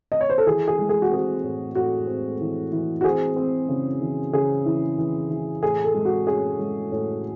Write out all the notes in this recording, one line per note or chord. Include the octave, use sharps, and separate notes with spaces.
D#5
C#5
C5
A4
E3 G#4
G#4
G#3
G#4
F#4
C4 G#4
A2
A2 F#4
C4
E3
E3
F#4
C4 G#4
C4
C#3
E3
C#3 G#4
E3
E3
E3
A2 G#4
A4
G#3
F#4
C#4 G#4
G#3
A2